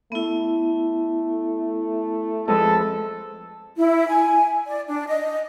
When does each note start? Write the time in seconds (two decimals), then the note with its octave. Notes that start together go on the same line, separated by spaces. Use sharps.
0.12 A3 B3 E4
2.48 F2 G#3 A4 B4
3.77 E4
4.08 G#5
4.67 D5
4.87 D4
5.08 D#5